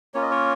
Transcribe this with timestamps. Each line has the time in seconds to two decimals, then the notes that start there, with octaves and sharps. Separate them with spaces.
0.14 A#3 C#4 F4 C#5
0.22 D#5
0.31 A#4 C#5